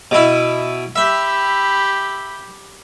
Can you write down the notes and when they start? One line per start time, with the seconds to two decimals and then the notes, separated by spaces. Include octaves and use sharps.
0.11 B2 E4
0.96 G4 E5 B5